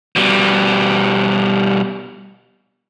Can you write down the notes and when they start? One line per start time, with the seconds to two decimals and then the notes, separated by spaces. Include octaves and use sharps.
0.16 B2 G3